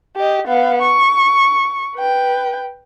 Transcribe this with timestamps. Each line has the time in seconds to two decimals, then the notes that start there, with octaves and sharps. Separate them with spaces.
0.16 G4 D#5
0.47 B3 F5
0.82 C#6
1.96 B4 G5